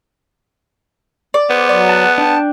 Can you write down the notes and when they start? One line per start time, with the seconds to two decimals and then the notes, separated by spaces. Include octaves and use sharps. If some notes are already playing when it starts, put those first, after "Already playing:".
1.34 D5
1.50 B3 C5
1.69 F#3 D5
1.89 F#5 A5
2.18 D4 G5 A5